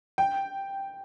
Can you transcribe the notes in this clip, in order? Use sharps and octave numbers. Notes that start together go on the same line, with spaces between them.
G5